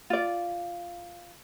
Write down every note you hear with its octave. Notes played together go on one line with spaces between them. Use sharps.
F4 D5